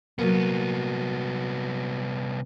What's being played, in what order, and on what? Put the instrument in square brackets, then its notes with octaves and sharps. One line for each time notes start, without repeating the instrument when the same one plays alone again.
[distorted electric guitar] C2 B3 [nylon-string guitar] F#3 A#3